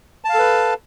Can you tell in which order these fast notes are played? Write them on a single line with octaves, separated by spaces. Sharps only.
A5 F5 A4 B4